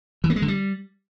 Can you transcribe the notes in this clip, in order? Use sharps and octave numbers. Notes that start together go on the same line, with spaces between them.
E3
A#3
G#3
D3
G3